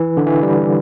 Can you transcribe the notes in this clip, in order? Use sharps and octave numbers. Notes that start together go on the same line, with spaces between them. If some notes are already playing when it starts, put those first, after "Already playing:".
Already playing: E3
D3
E3
G3